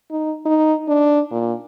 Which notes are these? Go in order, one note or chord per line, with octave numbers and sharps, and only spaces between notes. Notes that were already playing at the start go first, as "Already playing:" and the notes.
D#4
D#4
D4
A#2